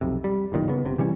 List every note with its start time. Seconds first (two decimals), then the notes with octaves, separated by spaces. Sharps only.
0.01 B1 F2 C3
0.24 G3
0.52 F#1 B1 A#2 D#3
0.68 C#3 B3
0.85 G1 C3
0.98 C3 E3 G3 C#4